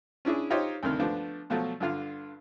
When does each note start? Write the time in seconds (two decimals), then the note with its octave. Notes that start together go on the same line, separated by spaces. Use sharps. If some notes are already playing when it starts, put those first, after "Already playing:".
0.25 C#4 D4 E4 G#4
0.50 D#4 F4 G4 C5 C#5 D#5
0.83 D2 G2 C3 D#3 F6
0.99 F3 A3 B3 D4
1.50 B2 F3 F#3 A3
1.80 G2 D3 F4 F6